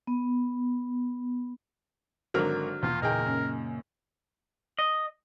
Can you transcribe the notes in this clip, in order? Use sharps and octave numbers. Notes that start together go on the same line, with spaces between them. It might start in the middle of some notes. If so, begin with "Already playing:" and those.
B3
G#1 D3 F#3 A#4 F6
E2 B2 A#3 F4
A#2 C#3 A#3 D#4 G#4 A#4 G5
F#2
D#5